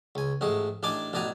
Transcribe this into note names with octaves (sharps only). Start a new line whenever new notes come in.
C#2 G#5
A1 G#2 A3 G#4 D#5
A1 D4 D#4 D5 G#5 D6
A1 B2 D5 D#5 G#5 A#5